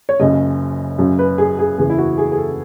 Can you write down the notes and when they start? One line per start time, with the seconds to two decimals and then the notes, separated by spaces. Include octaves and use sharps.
0.09 C#5
0.20 F#1 F#2 C#3 D#5
0.99 F#2 C#3 F#3
1.19 B4
1.38 G#4
1.59 G#4
1.78 F#1 E2 C#3 G#4
1.90 E4
1.98 F#4
2.18 G#4
2.32 G#4
2.38 A4